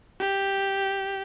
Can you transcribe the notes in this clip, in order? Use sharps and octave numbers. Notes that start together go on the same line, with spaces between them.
G4